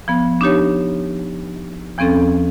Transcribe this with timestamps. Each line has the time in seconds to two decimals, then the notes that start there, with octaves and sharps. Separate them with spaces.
0.08 F3 B3
0.41 D4 D#4 G4 C#5
1.98 E2 F3 C4 C#4 A4